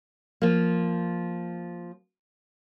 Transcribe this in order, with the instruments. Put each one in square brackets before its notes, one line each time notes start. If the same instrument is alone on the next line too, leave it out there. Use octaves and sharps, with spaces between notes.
[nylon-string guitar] F3 A#3